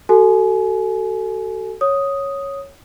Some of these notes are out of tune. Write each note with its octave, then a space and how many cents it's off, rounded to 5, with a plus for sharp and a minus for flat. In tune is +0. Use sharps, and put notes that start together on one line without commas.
F#4 +40 A4 +15 G#5 +30
C#5 +0 D#6 +0